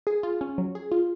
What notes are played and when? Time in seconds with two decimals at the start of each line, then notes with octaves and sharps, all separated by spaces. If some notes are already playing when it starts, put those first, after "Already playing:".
0.07 G#4
0.23 F4
0.41 C#4
0.58 F#3
0.75 G#4
0.92 F4